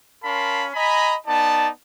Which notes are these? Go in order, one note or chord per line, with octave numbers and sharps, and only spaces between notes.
C#4 A#4 F5 A5 B5 C6
D#5 G#5 A#5 B5
B3 D#4 D5 A5